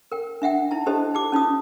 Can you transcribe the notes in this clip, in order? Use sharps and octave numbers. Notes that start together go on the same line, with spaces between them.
A#4 G5
D4 E5 F#5 G5
D#4 E4 A5
D4 D#4 G4 A4 C5 D#5
D#4 G4 D6
C#4 D#4 F4 D#6